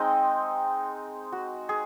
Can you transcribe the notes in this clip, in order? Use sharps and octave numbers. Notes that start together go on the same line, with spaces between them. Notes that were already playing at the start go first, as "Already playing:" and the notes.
Already playing: G#3 C4 D#4 D#5
F#4
G#4